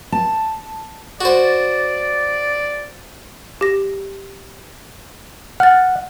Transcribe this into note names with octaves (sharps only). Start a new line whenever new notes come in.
A5
F#4 C5 D5
G4 A#6
F#5 F6 A6